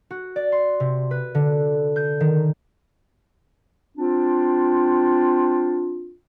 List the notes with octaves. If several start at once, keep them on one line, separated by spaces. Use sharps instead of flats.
F#4
D5
C6
C3
B4
D3
G6
D#3
C4 D4 F4